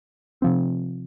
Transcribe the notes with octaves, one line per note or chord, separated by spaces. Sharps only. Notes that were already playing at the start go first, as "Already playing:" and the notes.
C3 F3 C4